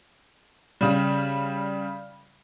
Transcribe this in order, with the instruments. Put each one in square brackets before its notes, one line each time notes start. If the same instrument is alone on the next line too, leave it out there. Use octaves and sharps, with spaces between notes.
[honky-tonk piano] C#3 G3